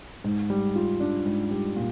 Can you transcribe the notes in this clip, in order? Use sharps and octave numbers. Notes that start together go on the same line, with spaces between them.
G#2
G3
F4
D4
G#2
G3
A#2